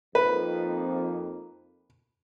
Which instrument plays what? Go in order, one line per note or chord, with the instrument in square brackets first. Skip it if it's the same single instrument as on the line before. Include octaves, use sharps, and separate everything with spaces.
[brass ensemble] F2 A#3 D#4 [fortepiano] B4